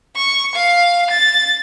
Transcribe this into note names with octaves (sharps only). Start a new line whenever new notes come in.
C#6
F5
A6